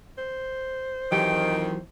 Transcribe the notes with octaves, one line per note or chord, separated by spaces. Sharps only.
C5
F2 D#3 E3 F#3 G4 G5